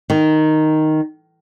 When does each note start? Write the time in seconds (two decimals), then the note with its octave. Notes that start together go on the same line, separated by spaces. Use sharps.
0.10 D#3